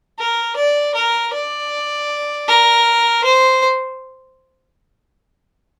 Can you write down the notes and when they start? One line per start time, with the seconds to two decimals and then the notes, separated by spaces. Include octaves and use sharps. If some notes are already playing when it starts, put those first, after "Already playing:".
0.19 A#4
0.56 D5
0.95 A#4
1.33 D5
2.48 A#4
3.24 C5